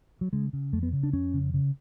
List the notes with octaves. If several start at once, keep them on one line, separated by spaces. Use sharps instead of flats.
F#3
C#3 G#3
C#3
F2 A3
B3
C#3
D4
F2 C#4
C#3
C#3